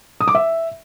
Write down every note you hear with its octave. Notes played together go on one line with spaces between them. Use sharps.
D#6
D6
E5